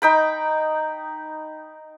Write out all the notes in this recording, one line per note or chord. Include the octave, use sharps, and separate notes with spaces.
D#4 G5 B5